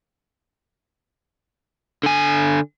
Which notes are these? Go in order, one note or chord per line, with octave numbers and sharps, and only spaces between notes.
D3 G#5